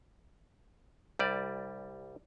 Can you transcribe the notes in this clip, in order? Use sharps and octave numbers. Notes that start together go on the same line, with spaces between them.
C2 G3 D5